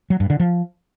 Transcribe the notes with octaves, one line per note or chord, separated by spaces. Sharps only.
F#3
G2
D3
F3